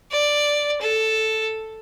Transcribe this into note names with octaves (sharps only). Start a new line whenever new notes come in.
D5
A4